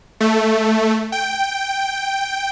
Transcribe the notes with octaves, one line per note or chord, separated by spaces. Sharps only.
A3
G5